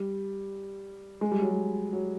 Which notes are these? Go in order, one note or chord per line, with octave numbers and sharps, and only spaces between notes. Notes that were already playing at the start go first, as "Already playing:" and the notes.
Already playing: G3
G#3
G3
F#3
G3
F#3